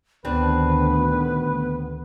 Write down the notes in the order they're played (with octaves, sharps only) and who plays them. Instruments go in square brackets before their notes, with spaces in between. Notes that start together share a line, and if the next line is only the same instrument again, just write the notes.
[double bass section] D2 A#2 D#3 [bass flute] B3 [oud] C4 D4 [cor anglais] B4